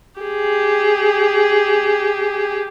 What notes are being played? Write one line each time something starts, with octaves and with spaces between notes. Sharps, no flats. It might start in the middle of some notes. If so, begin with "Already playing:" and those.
G4 G#4